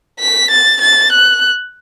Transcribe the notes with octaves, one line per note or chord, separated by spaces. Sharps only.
B6
A6
A6
F#6